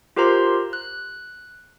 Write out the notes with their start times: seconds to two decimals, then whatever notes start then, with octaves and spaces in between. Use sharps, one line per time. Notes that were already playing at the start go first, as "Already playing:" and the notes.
0.17 F4 G4 A#4 C5 A#5 C6
0.73 F#6